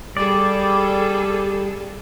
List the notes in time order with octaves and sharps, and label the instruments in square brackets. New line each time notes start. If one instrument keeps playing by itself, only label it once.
[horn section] G3 [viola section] G#4 A4 [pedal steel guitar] D5